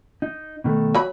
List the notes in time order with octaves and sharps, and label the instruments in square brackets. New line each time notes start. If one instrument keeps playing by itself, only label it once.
[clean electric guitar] D#4
B2 D#3 A3
[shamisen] F#3 B5